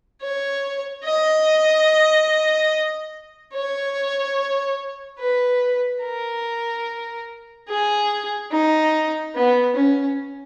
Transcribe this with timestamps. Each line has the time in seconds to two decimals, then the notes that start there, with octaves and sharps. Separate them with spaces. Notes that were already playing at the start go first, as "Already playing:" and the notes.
0.22 C#5
1.05 D#5
3.53 C#5
5.20 B4
6.03 A#4
7.68 G#4
8.51 D#4
9.35 B3
9.76 C#4